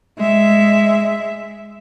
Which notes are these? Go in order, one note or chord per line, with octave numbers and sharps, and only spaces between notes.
G#3 E5